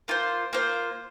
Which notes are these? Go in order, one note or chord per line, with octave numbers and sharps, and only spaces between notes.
A#3 F4 C5
A#3 F4 C5